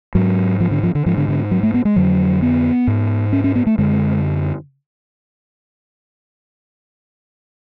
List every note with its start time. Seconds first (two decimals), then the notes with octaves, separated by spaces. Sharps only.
0.15 G#2 F#3
0.60 F3
0.71 D3
0.83 F3
0.95 D3
1.06 G#2 F3
1.17 D3
1.28 D3
1.51 F#3
1.63 A3
1.74 B3
1.85 G#3
1.96 F2 D3 F#3
2.42 B3
2.87 G#2
3.33 C#4
3.44 C#4
3.55 B3
3.67 A3
3.78 F#2 D3 G#3